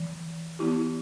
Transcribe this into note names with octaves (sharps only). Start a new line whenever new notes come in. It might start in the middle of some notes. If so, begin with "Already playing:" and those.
Already playing: E3
E3 B3 E4 G4